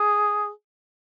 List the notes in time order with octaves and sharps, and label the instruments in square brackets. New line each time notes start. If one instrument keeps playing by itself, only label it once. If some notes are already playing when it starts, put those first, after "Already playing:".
Already playing: [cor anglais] G#4